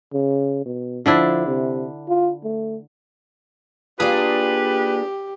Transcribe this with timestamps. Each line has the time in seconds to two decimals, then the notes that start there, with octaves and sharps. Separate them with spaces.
0.13 C#3
0.66 B2
1.06 D3 F3 D4 E4
1.46 C3
2.09 F4
2.44 A3
4.00 A#3 D4 F4 G4 G#4 B4 G#5